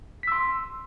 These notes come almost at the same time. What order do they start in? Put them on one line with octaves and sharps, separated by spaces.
B6 E6 C6